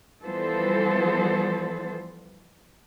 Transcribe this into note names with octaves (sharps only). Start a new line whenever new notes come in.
E3 F3 G3 B3 A4 C5